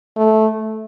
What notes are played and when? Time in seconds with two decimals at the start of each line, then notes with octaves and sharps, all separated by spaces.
0.17 A3